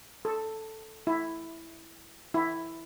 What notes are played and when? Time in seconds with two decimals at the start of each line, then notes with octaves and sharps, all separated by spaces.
0.25 A4
1.07 E4
2.34 E4